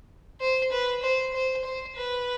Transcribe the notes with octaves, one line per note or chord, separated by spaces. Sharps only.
C5
B4
C5
C5
C5
B4